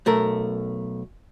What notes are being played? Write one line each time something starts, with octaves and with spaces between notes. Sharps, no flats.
B1 A3 A#4